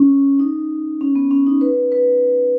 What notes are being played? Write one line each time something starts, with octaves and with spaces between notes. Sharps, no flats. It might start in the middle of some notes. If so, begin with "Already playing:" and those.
Already playing: C#4
D#4
C#4
B3
C#4
D#4
B4
B4